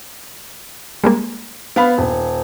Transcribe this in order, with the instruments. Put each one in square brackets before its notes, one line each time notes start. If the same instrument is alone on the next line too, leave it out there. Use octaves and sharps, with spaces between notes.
[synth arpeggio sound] G3 G#3 A#3
[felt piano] B3 F5 B5
D#1